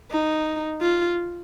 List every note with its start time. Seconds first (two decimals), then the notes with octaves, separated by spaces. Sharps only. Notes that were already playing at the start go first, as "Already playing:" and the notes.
0.11 D#4
0.81 F4